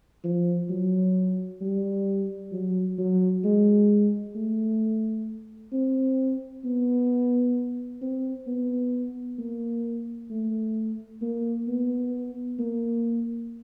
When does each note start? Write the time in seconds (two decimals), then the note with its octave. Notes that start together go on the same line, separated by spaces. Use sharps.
0.24 F3
0.70 F#3
1.61 G3
2.52 F#3
2.98 F#3
3.44 G#3
4.35 A3
5.73 C4
6.65 B3
8.02 C4
8.47 B3
9.39 A#3
10.30 A3
11.22 A#3
11.68 B3
12.59 A#3